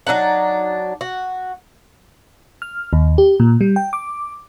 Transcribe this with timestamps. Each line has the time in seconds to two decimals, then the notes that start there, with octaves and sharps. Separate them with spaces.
0.07 F#3 D4 D#4 F#5
1.01 F#4
2.62 F6
2.93 D#2
3.18 G4
3.40 A#2
3.61 G3
3.76 G5
3.93 D6